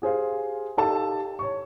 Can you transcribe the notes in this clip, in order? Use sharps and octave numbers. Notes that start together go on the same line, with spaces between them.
G4 G#4 C5 F5
D#4 G4 A4 F5 A5
C#5 C#6